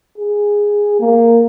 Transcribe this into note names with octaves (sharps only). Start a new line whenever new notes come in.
G#4
A#3